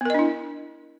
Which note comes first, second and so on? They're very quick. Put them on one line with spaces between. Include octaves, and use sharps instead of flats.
B3 A#4 D#5 D4 E4